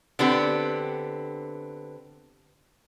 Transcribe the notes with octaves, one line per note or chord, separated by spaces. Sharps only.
D3 B3 C4 G4